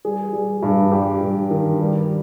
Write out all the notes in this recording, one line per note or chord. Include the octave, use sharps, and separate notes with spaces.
G3 G#4
G3
G2
G3 G4
G2
D#3
G3